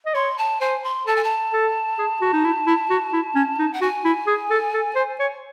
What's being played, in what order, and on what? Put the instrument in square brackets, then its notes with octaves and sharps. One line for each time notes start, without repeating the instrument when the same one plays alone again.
[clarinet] D#5
[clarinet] C#5 [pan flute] C6
[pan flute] A5
[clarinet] C5 [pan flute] G#5
[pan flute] C6
[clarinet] A4 [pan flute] A5
[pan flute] G#5
A5
[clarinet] A4
G#4
F#4
D#4
E4
E4
F#4
E4
C#4
D#4
[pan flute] F#5
[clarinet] F#4 [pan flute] G#5
[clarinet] E4
G#4
A4
A4
C5
C#5